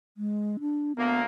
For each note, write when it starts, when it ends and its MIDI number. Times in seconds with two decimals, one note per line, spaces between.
0.17 0.57 56
0.60 0.92 62
0.96 1.26 38
0.96 1.26 58
0.96 1.19 59